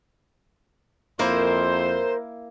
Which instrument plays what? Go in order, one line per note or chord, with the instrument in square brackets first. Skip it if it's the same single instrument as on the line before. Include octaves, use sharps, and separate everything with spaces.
[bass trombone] F2 [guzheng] A#3 E4 [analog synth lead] A#4 [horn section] C5